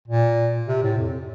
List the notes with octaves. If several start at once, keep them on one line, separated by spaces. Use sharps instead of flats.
A#2
C3
A2
F2